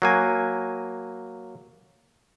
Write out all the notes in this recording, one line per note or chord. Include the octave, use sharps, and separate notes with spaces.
F#3 A#3 G#5